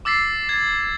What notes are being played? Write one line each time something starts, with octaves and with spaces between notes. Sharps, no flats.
D6 E6 A6 B6 C7
G#6 A6